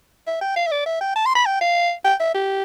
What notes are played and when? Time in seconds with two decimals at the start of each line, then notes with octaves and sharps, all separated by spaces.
0.27 E5
0.41 G5
0.56 F5
0.67 E5
0.71 D5
0.86 E5
1.01 G5
1.16 A5
1.26 C6
1.35 B5
1.46 G5
1.61 F5
2.04 G5
2.20 E5
2.34 G4